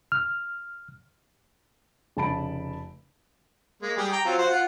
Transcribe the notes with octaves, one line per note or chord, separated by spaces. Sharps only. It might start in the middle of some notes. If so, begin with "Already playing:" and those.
F6
F1 C#3 A5 B5 D7
G#3 A#3
G3 G4 G#4
G5 A#5
F#3 C4 F4
F4 F#4 C5
F4 F#5